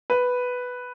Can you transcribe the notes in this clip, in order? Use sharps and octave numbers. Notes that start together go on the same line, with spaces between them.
B4